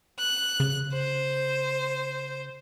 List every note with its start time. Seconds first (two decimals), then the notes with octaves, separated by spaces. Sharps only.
0.20 F#6
0.60 C#3
0.94 C5